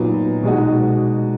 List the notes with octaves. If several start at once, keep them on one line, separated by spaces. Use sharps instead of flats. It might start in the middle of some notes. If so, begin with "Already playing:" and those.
Already playing: A#2 F#3 B3 D#4
B2 G#3 D#4 F#4